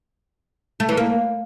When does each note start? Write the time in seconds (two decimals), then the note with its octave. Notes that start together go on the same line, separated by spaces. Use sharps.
0.80 A3
0.89 E3
0.97 A#3